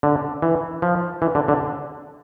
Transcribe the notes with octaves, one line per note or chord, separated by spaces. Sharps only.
D3
E3
F3
E3
D3
D3